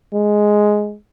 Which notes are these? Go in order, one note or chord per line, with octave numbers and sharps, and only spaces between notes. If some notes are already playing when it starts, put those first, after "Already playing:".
G#3